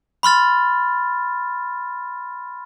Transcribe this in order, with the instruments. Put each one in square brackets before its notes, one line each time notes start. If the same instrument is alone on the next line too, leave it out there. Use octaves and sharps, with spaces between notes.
[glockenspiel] B5 C6 F6 A6